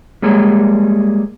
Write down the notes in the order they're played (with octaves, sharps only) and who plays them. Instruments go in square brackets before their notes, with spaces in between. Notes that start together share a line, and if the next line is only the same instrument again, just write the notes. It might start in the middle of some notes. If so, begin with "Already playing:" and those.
[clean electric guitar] G3 G#3 A#3 G#4 C#5